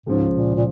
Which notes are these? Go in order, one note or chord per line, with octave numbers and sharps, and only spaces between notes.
C#2 G#2 C#3 F3
A#2
A#2